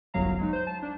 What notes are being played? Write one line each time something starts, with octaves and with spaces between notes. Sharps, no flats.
G1 C2 F#2 F#3 F5 A#5
F#3 G#3 D#4
C5 G6
A5
D4